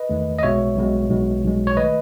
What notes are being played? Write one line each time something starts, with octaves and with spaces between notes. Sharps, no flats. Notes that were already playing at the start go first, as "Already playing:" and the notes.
Already playing: B4 D#5
E2 D#3 A3
D#5
B1 B2 G#3 C#5 E5
B1 B2 G#3
B1 B2 G#3
B1 B2 G#3
C#5
D#3 A3 B4 D#5